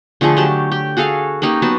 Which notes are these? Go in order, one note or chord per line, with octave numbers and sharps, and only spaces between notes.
D3 F3 A3 G#4
F#3 G4 A5
G4
F#4 G#4 A4 F5
A#3 C#4 D#4 G4
F#3 B3 A5